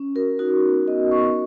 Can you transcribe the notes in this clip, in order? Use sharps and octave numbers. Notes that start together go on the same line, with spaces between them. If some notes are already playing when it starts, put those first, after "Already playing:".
Already playing: C#4
F#4 A#4
D#4 F#4
B3
B3 D#5
B3 C#6